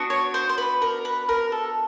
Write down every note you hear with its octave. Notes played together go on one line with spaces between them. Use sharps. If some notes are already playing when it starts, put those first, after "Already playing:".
Already playing: B3 D4 F#4
C#5
C5
C5
B4
A#4
B4
A#4
A4